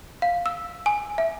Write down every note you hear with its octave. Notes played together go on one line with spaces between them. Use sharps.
F5
E6
G#5
E5